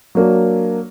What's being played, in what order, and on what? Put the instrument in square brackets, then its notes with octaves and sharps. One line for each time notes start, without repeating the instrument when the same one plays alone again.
[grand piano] F#3 A#3 D4